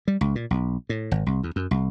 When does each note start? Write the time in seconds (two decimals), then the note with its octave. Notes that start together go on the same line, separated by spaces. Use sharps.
0.08 G3
0.21 C#2
0.35 A#2
0.51 B1
0.89 A2
1.11 G#1
1.26 C2
1.43 E2
1.56 F#2
1.71 C2